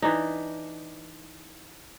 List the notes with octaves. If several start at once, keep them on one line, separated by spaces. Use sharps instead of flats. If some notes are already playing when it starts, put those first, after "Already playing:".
E3 D4 D#4